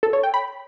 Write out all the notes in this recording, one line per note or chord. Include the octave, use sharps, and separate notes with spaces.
A4
C#5
G5
B5